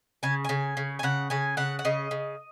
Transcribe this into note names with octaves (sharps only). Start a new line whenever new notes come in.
C#3 G#5
C#3 G#5
C#3
G#5
C#3 F#5
C#3 G#5
C#3 F#5
F#5
C#3 D#5
C#3